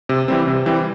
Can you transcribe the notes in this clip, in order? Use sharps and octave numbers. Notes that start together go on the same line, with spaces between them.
C3
E3 G3 C4
C3
E3 G3 C4